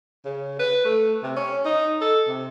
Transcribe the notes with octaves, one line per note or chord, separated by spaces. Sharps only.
C#3
B4
A3
C3
C#4
D#4
A4
C3